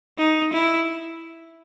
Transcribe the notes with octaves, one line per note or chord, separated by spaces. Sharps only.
D#4
E4